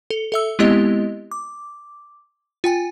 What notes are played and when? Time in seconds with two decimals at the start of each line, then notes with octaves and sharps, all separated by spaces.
0.10 A4
0.32 A4 E5 E6
0.59 G#3 B3 C4 E4 G4 D#5
1.32 D6
2.64 F4 G5 G#5